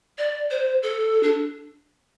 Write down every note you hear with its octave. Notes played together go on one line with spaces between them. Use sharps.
D5
C5
A4
D4